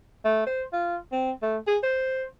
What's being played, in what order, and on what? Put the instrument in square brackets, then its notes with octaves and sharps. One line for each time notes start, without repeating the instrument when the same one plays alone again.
[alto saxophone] A3
C5
F4
C4
A3
G#4
C5